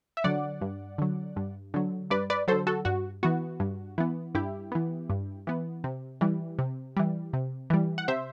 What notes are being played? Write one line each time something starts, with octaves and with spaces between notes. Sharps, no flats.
E5
D3 F#3 D5 F#5
G2
D3 F#3
G2
D3 F#3
G2 B4 D5
B4 D5
D3 F#3 A4 C5
F#4 A4
G2 F#4
E3 B3 F#4
G2
E3 B3
G2 E4 G4
E3 B3
G2
E3 B3
C3
E3 G3
C3
E3 G3
C3
E3 G3
F#5
C3 C5 E5